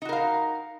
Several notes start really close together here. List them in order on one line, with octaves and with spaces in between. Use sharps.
D#4 F#4 A#4 F5